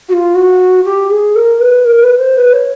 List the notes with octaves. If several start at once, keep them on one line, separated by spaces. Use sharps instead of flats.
F#4
F4
F#4
G4
G#4
A#4
B4
A#4
B4
C5
B4
C#5